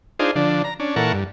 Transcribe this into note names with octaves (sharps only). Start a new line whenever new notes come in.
D4 D#4 F4 G#4 C5
D3 F3 D4
A#5
C#4 D4
A#2 E3 A4 A#4 F#5 C#6
G2